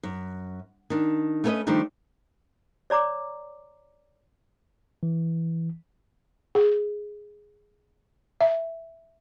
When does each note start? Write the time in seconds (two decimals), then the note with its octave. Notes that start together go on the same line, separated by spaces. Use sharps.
0.03 F#2
0.90 D#3 D4
1.44 A3 B3 C#4 A#4 B4 D#5
1.67 D#3 F3 G3 A3 D4 D#4
2.90 C#5 D5 A#5 D6
5.03 E3
6.55 G#4
8.41 E5